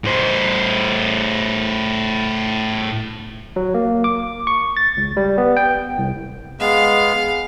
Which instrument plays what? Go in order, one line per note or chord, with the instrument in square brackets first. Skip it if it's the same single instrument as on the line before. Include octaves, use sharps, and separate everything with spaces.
[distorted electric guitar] A2 C5
[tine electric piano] F#3
A#3
D6
C#6
A6
C#2
G3
B3
G5
C2
[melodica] G#3 B3 [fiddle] F5